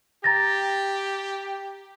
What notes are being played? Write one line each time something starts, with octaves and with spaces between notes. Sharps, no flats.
G4 A#5 A6 A#6